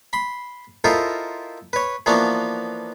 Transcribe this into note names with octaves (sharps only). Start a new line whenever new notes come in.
B5 C6
E4 F4 A4 A#4 C5 D#5
B4 C#5
E3 F3 A#3 B3 D4 F#4